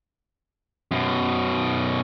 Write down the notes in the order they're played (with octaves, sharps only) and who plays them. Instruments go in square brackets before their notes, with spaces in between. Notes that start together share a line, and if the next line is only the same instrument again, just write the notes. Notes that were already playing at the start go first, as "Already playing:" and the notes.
[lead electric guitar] F#2 B2